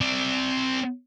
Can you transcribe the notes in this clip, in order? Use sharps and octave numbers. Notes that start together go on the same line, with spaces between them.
C4 D5